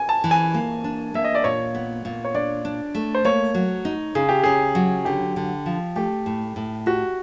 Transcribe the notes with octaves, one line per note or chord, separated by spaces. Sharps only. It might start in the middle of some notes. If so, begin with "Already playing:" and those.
Already playing: G#5
A5
E3
G#5
A#3
D4
A#3 E5
D#5
D5
A#2 C#5
B3
A#2
C#5
D4 D5
D4
A3
C5
A#3 C#5
F#3
D#4
C#3 G#4
G4
C#3 G#4
F#3
D3 G4
D3
F3
A3 G4
A2
A2
F#4 G4